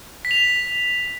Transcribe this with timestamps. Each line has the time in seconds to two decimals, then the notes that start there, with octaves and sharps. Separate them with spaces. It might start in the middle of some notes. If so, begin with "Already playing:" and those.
0.25 B6
0.31 F7
0.37 B6